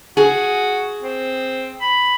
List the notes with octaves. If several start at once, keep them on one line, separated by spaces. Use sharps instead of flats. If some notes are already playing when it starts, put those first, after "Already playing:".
F#4 G#4
C4
B5